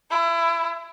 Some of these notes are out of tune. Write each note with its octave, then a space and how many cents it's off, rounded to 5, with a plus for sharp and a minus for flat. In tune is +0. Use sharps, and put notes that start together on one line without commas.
E4 +30